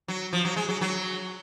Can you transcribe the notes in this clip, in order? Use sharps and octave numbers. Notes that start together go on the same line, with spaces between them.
F#3
F3
F#3
G#3
F#3
F#3